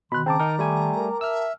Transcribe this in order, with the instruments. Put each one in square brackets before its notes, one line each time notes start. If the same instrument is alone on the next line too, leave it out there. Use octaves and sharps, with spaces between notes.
[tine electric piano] B2 [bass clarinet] D#3 [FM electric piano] B5 F#6 [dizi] C6
[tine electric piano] C#3 C4 [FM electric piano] G5 A5 D6 [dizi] A#5
[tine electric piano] D#4 A#4
G3 A3 G#5
[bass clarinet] A#4
[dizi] E5 [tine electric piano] E6 F6